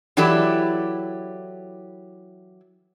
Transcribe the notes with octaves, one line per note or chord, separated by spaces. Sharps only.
E3 F#3 E4 G4 A4 D5